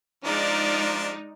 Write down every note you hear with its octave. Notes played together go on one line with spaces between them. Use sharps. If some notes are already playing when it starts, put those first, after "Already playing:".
F3 G#3 D4 D#4 D5 F6